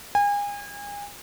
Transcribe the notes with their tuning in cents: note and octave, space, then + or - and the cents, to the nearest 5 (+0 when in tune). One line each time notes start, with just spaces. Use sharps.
G#5 -35